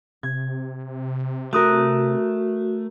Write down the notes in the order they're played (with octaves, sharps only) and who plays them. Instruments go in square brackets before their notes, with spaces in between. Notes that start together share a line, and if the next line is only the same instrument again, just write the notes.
[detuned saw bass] C3 [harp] G#6
[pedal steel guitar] A3 [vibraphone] F#4 [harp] A#4 D#6 F#6